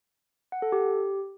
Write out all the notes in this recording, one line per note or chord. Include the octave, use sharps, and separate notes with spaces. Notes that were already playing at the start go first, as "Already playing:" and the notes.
F#5
A4
G4